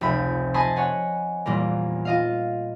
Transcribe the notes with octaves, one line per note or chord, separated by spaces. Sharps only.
F1 C#2 C3 G5 B5
D#5 G#5 A5 B5 C6 D#6
C#5 F#5 G#5
E2 A#2 G3 A#3
F4 D#5 F5